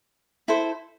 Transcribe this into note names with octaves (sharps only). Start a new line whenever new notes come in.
E4 A4 C5